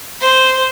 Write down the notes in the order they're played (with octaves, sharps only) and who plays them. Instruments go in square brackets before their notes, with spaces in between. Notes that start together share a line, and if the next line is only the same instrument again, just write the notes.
[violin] C5